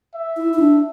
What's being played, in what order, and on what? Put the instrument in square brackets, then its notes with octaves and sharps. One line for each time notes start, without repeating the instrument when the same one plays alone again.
[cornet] E5
[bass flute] E4
E4
D4